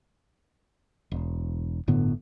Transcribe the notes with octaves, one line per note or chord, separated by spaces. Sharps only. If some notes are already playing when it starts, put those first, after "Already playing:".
E1
G1 A2 D3 B3